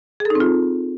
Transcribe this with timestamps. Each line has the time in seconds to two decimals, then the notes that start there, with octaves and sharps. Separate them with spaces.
0.20 G#4
0.25 A4
0.30 D#4
0.35 C4
0.40 F4